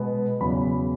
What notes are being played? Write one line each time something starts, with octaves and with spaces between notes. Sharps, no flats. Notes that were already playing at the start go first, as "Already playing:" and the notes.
Already playing: B2 G#3 B3
E2 C#3 F#3 B5